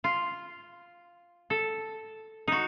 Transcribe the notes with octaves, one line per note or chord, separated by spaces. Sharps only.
F4
A4
D#4 F#4